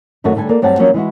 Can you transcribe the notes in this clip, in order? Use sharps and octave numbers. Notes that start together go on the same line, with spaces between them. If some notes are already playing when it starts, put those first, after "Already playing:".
F#2 D#3 A3 D4 F#4
D3 G3 A4 G#5
A#3 D5
G2 F#3 C4 G4 F#5 A5
F3 F#3 A#3 C#4 F#4
E3 G#3 E4 F#4